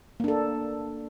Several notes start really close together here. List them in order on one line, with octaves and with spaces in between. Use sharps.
A#3 D4 A4